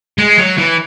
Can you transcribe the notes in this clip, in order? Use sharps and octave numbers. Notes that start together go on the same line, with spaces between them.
G#3
F#3
E3